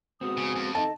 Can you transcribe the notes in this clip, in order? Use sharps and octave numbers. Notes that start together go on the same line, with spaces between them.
G#3 B3 C4 F#4 D#6
C#3
F2
D#4 A4 D#5 A5